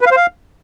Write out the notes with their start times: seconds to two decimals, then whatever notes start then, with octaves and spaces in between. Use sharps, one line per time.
0.01 B4
0.06 F5
0.11 C5
0.17 F5